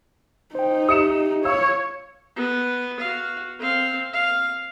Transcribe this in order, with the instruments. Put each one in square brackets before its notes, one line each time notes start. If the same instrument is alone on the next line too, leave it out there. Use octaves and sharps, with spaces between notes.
[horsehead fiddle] D#4 [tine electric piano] C5 G5
[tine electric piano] G4 E5 [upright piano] D#6 C#7 E7
[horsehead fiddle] C#5 [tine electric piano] F5 [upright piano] E6
[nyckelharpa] B3
F#4 F5
C4 F5
F5